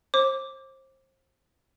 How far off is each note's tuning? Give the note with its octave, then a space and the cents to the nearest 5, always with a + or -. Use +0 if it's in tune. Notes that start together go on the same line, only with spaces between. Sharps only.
C5 +30 D6 -5